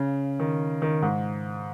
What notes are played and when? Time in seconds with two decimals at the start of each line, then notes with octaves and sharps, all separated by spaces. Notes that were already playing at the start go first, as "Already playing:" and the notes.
Already playing: C#3
0.40 D#3
0.82 D#3
1.02 G#2